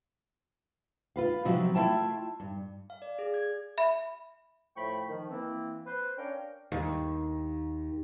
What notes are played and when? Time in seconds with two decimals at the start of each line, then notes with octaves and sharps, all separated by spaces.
1.16 F4 B4 F5
1.45 C3 F3 F#3 C4
1.75 A3 E4 F4 E5 G5 A5
2.40 G2
2.90 F5
3.02 D5
3.19 G#4
3.34 G#6
3.78 E5 B5
4.77 A2 F3 A3 G5 B5 C#6
5.07 D#3 F3
5.30 E3 A#3 C4
5.85 B4 C5
6.17 C#4 D4 A#4 C#5 F5 G5
6.72 D#2